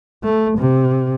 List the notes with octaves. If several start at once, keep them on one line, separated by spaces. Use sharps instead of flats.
A3
C3